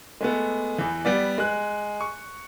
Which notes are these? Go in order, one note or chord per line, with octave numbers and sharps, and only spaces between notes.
G#3 A3 B3
E2 E3
G3 B3 D5
G#3 F#6
C#6